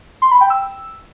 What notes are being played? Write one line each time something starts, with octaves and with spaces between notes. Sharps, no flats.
C6
B5
G5
E6